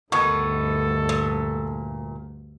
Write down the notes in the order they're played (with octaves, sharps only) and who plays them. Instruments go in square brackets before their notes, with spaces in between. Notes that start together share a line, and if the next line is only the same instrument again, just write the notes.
[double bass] D2 G2 [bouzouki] D#3 B3 [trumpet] A4 [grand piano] C#6 G#6
[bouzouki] A#2